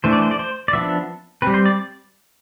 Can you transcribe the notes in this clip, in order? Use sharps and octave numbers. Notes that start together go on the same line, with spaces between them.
E3 A3 D4 C5
D5
C5
D5
C5
D5
F3 B3 D4 E5
G3 C4 B4
C5
D5